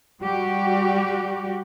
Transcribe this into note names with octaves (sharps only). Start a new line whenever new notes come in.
G3 F#4 G4